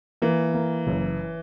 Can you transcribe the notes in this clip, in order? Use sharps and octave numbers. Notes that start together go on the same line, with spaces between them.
E3 A#3
A#3
F#1